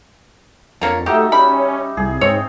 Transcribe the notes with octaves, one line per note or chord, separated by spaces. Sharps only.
F2 D3 A#3 C#5
A3 D#4 F#4 G4 E5
G3 C#4 B5
C2 G#4
G#2 C4 C#5